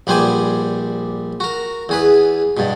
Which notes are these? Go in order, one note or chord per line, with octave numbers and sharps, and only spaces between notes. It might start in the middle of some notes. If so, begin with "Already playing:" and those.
A#1 G3 B3 C5 G#5 D6
F#4 A#4
E2 G#4 B4
G2 B2